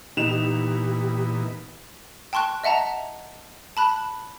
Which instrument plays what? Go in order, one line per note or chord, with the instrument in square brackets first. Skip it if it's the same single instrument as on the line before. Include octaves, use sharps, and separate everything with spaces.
[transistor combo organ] A#2 E3 B3 [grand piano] D#4 E7 F7 [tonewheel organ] G4
[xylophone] G5 A5 C6 C#6 F#6
D#5 E5 F#5 A5 A#5
A5 B5 F#6